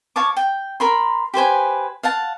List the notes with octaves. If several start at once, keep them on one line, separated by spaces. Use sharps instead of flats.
C#5 F5 A5 D6
G5
A#4 B5 C6
G4 B4 C5 G#5
F5 F#5 A5